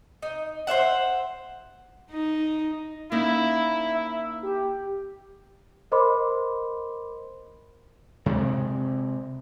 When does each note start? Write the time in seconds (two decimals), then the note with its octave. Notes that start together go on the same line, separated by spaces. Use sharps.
0.23 D#4
0.67 C5 C#5 E5 F#5
2.11 D#4
3.12 A#3 C#4 D#4 E4
3.94 E5
4.43 G4
5.92 A#4 C5 D#5 B5 C6 D6
8.26 C3 G#3 C4